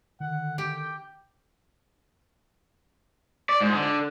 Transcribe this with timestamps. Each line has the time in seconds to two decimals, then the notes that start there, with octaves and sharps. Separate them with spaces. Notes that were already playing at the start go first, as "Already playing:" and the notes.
0.20 D3 D#3 F#5
0.58 G4 G5
3.49 D5
3.61 G#2
3.74 D3